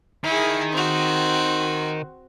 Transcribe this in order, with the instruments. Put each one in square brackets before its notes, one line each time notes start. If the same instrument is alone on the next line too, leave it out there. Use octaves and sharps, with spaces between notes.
[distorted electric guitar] D#3 [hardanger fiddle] E4 G#4
[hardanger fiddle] C4 F#4